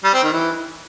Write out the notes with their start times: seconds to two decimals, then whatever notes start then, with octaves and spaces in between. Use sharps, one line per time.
0.04 G3
0.13 C4
0.23 D#3
0.32 E3